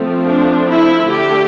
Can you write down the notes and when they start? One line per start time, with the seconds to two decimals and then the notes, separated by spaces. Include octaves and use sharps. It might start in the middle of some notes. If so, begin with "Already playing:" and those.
Already playing: F3 A3 C4
0.24 D4
0.66 E4
1.08 D3 A3 D4 G4